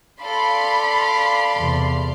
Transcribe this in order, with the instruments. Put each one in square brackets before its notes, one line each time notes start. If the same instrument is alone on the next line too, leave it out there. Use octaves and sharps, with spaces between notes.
[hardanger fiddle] A4 [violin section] D5 F5 C6 [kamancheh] B5
[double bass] E2 C3